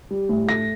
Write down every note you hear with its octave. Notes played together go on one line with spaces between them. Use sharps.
G3
A2
A3 A#6